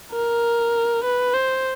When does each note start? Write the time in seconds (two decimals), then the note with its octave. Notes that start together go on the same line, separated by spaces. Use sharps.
0.12 A#4
1.04 B4
1.33 C5